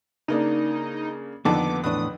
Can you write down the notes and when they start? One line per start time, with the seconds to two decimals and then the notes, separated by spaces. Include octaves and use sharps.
0.28 C#3 A#3 D4 D#4
1.45 F2 D3 D#3 A#3 B3 A5 D6
1.84 E2 A2 D4 B4 D#6